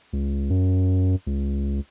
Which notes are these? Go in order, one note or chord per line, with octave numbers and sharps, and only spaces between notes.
C#2
F#2
C#2